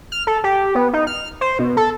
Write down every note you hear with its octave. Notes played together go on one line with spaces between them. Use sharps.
F6
A4
G4
B3
D#4
F6
C5
B2
A4